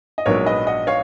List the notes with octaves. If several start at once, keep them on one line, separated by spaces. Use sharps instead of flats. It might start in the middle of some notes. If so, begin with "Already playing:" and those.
D#5
A#1 G#2 F#3 B3 A#4 C#5
B4 D#5
D#5 F#5
C#5 F5